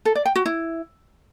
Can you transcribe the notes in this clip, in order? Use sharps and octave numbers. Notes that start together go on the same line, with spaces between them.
A4
D5
G5
F#4
E4